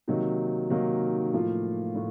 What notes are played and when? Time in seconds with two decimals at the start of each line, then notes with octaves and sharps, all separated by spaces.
0.08 C3 D#3 F#3 A#3 D#4
0.70 C3 D#3 F#3 A#3 D#4
1.33 A2 F3 A#3 F4
1.95 A2